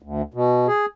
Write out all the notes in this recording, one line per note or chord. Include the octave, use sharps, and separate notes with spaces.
D2
B2
G#4